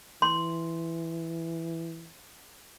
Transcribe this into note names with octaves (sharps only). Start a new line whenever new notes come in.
E3 C6